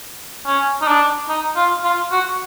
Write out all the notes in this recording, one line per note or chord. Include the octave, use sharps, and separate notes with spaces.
C#4
D#4
D4
D#4
F4
F4
F#4